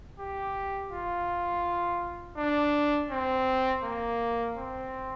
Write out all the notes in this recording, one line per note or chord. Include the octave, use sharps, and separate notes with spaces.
G4
F4
D4
C4
A#3
C4